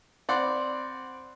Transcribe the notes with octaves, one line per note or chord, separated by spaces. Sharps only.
C4 D5 F#5 B5 C6